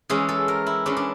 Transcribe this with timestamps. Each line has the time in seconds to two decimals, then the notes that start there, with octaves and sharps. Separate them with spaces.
0.10 E3 G#3 C#4 G#4
0.29 A4
0.48 A#4
0.66 E4
0.86 E3 G#3 C#4 D4
0.97 D4